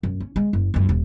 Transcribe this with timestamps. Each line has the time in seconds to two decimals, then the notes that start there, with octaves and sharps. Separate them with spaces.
0.03 F#2
0.20 C#4
0.36 G#3
0.53 F#1
0.74 C#2 F#2
0.89 D#1